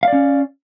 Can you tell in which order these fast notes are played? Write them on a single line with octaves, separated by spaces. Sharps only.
F5 D5 C#4